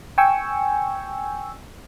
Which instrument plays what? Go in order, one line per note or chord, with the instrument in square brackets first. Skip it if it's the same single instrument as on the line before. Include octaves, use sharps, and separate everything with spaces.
[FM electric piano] G5 G#5 C#6 E6